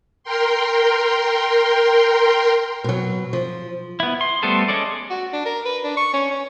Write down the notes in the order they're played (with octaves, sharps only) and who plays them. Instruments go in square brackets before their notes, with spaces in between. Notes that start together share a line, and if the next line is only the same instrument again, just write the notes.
[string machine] A#4 G5 C6
[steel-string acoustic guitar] B2 F#3
F3
[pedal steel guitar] B3 E4
C6
G3 A3 B3 A4 C5
G#3 C#4 A4 D5
[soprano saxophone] F#4
D4
A#4
B4
D4
C#6
C#4
C#4